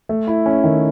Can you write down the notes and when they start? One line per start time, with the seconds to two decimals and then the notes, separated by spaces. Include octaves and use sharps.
0.09 A3
0.27 E4
0.46 C#4
0.64 D#3